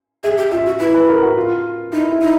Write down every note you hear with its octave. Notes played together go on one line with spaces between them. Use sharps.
G#4 E5
G4
F4 E5
F#4
E4 B4
B4
A#4
F#4
F4
D#4 E4
E4
D#4